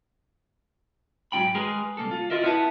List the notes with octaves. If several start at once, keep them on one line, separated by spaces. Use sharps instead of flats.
G#2 F#3 G#3 D#4 G5 B5
G#3 G#4 A#4 B4
C2 A#3 A4
F4
E4 F4 A#4 D#5 E5
B3 E4 B4 E5 A5